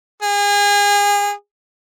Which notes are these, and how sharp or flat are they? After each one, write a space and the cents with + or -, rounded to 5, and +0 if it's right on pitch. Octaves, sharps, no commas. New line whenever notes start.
G#4 -30